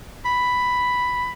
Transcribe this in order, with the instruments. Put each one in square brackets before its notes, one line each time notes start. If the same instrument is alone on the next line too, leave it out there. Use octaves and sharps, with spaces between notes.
[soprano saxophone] B5